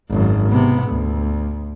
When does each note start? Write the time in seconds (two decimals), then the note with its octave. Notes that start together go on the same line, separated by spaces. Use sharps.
0.10 G#1 F#2
0.49 C3 B3
0.87 D2